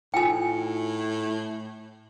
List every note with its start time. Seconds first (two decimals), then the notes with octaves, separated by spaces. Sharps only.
0.14 A2 D#4 F4 G5 G#5